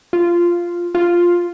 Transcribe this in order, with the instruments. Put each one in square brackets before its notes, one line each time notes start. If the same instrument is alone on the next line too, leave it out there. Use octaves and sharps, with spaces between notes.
[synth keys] F4
F4